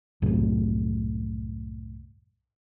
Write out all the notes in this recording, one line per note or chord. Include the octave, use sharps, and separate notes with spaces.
C2 F#2 A2